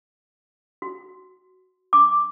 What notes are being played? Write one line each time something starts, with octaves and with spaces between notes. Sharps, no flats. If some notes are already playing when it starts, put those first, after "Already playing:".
F#4
D6